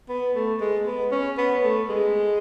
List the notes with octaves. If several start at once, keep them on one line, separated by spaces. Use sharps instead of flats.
B3
A3
G#3
B3
C#4
B3
A3
G#3